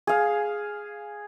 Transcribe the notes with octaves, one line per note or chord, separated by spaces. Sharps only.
G#4 F5